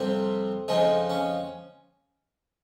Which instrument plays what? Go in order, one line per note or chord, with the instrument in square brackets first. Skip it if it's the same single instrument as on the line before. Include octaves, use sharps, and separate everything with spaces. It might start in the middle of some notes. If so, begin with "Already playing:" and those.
Already playing: [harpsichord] F2 C3 G3 C4
F2 C#3 F3 G#3 D#4
C#4